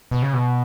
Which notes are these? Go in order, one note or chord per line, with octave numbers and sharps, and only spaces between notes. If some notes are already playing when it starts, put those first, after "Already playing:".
B2
C#3
B2